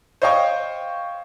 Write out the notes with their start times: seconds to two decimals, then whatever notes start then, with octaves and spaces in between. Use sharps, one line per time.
0.22 C5 C#5 D#5 F5 G5 C#6